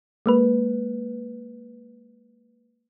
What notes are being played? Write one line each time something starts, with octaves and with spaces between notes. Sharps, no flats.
G#3 A#3 B4